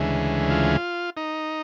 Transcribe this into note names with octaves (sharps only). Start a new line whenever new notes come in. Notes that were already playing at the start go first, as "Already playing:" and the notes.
Already playing: D2 C#3 E3 G#3
F4
D#4